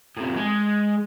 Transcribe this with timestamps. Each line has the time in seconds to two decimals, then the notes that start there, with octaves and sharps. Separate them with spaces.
0.17 A2 C3
0.36 G#3